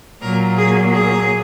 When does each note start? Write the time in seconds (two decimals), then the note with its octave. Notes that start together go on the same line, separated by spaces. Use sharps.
0.21 A#2 F#3 A#3 A#4
0.58 G#4
0.93 G#4